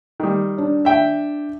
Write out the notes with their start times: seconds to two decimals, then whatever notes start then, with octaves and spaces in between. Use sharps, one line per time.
0.20 D#3 G3
0.58 D4
0.85 E5 G5